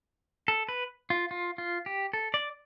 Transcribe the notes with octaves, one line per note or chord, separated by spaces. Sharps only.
A4
B4
F4
F4
F4
G4
A4
D5